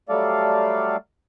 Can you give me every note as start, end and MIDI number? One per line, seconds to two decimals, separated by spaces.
0.09 0.96 54
0.09 0.96 55
0.09 0.96 57
0.09 0.96 69
0.09 0.96 74
0.09 0.96 77